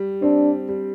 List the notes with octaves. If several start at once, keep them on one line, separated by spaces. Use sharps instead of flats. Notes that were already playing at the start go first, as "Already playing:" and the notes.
Already playing: G3
C4 D4
G3